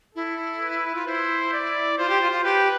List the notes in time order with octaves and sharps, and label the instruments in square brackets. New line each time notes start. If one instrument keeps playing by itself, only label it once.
[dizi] E4 [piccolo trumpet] A4
[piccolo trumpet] B4
[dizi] F4
[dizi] E4 [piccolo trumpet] C5
[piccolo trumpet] D5
[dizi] F4 [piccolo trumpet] C5
[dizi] G4
F4
F4
[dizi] G4 [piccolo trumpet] B4